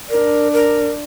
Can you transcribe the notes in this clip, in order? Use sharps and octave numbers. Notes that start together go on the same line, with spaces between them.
D4 A#4
A#4